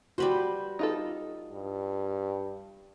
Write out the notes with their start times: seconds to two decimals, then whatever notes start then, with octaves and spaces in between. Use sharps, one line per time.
0.18 G3 F#4 B4 C5
0.79 D#4 F4 A4
1.52 G2